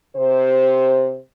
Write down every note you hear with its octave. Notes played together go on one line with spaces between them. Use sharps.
C3 C5